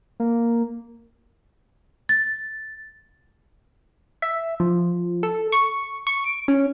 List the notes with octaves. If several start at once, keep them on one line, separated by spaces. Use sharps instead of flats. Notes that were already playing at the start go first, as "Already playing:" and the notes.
A#3
A6
E5
F3
A4
C#6
C#6
D7
C#4